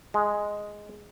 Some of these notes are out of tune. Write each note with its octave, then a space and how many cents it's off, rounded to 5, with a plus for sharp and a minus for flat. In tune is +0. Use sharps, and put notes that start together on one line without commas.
G#3 +0